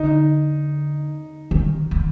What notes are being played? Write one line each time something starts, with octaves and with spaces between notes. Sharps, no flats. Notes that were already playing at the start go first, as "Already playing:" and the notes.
Already playing: D3 D#4
D#3
D#3